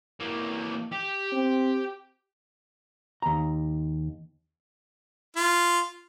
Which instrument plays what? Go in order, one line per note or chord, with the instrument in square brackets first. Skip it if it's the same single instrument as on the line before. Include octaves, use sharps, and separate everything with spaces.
[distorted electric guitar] E3 A#3
G4
[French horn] C4
[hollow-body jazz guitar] D#2 A#5
[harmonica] F4